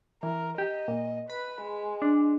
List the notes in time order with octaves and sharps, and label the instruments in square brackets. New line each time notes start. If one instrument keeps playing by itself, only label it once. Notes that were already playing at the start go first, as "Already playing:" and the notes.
[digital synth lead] E3 [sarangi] A#4
[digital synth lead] G4 [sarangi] D#5
[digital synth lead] A#2
[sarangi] B4 [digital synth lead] B5
[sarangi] G#3
[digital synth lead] D4